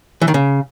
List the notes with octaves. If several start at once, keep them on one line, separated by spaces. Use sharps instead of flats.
E3
D#3
C#3